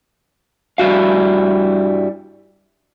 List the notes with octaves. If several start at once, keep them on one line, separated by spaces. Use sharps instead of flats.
G2 G3 E4 F#4 F5